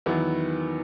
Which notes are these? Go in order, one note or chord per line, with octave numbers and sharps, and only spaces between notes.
E2 D#3 F#3 B3 E4